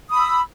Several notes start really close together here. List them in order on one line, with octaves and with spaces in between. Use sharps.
D#6 B5 E6